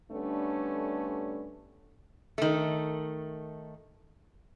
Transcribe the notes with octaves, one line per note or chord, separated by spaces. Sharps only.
D3 G3 A3 B3 C#4 D4
D#3 A3